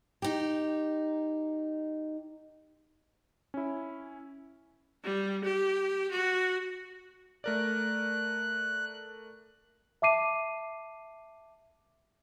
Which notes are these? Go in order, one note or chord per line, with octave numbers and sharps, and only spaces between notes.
D#4 G4
C#4 E4
G3
G4
F#4
A3 A#4 D5 F#6
E5 A5 D6 C7 D#7